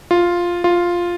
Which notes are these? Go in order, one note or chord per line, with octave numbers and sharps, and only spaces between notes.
F4
F4